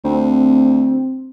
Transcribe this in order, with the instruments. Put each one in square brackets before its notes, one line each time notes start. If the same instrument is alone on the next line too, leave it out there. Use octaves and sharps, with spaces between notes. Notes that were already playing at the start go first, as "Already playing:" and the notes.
[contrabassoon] D2 [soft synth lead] C4